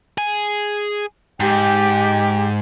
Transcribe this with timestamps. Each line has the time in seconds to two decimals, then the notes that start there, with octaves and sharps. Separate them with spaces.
0.18 G#4
1.40 G#2 G4 G5